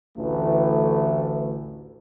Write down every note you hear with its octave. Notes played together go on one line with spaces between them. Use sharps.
A1 D2 E3 A3